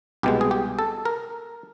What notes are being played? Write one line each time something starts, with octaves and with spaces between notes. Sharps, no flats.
C2 B2 G#3 G4
G#4
G4
A4
A#4